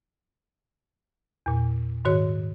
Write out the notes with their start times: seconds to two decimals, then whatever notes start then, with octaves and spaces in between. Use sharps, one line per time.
1.46 E2 A#2
2.05 G#2 D#3 F#4 C#5